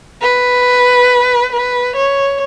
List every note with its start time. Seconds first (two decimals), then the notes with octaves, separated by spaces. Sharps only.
0.21 B4
1.52 B4
1.96 C#5